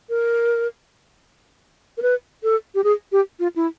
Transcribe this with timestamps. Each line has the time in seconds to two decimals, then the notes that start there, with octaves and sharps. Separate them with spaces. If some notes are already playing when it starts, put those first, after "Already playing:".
0.10 A#4
1.98 A#4
2.02 B4
2.43 A4
2.75 G4
2.84 G#4
3.12 G4
3.40 F4
3.56 E4